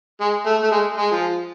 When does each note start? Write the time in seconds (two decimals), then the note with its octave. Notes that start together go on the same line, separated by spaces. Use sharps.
0.21 G#3
0.46 A3
0.63 A3
0.71 G#3
0.97 G#3
1.12 F3